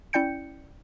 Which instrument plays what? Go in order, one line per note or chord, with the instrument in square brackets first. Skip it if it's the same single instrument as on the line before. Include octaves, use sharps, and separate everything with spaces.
[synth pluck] C#4 E4 D5 G5 G6 C#7